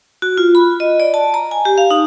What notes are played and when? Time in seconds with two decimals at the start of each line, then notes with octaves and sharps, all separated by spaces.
0.22 F#4
0.38 F4
0.55 B5
0.80 D#5
1.00 D5
1.14 A5
1.34 A#5
1.51 G#5
1.65 G4
1.78 F5
1.91 D#4